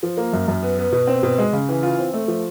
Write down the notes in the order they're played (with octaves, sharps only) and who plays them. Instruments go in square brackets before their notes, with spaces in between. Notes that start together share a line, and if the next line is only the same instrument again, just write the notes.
[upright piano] F3
A#3
F#2
F#2
B3
B3
B2
C4
B2
G#3
C#3
E3
F4
C4
A3
F3